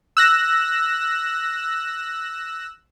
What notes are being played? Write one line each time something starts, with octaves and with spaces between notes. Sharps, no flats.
E6 F#6 A#6